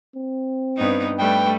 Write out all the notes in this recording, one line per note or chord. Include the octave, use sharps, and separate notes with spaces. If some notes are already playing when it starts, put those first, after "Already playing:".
C4
G2 B3 D#4
G3 A3 B4 G5